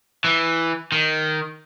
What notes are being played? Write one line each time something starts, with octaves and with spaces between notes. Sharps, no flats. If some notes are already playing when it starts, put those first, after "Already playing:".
E3
D#3